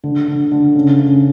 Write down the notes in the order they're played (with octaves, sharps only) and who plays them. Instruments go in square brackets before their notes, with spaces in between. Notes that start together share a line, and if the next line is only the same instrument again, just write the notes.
[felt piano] D3
D3
D3
C#3
C#3